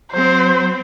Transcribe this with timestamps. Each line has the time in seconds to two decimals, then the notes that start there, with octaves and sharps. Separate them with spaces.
0.12 F#3 C4 C5